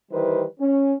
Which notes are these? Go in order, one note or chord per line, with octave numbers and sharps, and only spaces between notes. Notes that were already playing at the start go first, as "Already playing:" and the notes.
D#3 E3 G3 E4 B4 C5
C#4